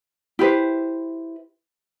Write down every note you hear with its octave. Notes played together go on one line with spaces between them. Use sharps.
E4 G4 B4 C5